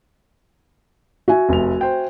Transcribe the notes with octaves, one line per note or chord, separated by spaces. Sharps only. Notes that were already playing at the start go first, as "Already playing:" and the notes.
F#4 E5 G#5
F1 F7
C5 G5